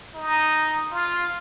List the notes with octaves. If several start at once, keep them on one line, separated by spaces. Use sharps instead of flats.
D#4
F4